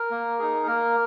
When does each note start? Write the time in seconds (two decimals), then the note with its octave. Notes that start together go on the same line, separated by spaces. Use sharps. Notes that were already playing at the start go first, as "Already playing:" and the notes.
Already playing: A#4
0.11 A#3
0.39 D#4 G#4
0.67 A#3 A#4